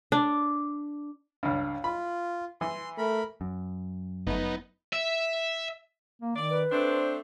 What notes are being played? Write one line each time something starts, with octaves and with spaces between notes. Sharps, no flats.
D4
C#2 G2
F4 B5
E3 C6
A3 A#4 B5
F#2
G1 A3 B3 D#4
E5
A#3
D#3 D5
B4
A3 C4 D4 C5